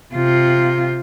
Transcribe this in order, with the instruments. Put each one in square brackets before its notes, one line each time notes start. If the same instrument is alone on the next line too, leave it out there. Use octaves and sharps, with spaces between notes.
[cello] C3 F4